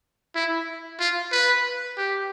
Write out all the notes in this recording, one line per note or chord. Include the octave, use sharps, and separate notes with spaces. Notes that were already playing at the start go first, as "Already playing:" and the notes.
E4
F4
B4
G4